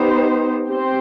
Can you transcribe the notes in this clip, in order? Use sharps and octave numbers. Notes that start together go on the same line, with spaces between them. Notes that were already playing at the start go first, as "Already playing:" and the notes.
Already playing: B3 D#4 G4 C5
C4 G4 C5